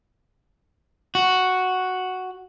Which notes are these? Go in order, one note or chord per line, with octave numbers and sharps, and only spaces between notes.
F#4